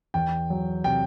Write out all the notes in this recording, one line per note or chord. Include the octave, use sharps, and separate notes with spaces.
E2 G5
F#3
C3 G5